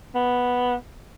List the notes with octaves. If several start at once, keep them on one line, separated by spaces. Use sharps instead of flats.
B3